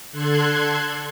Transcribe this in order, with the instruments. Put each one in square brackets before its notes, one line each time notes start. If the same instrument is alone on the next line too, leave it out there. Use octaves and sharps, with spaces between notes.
[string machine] D3 A4 C6 F#6 G#6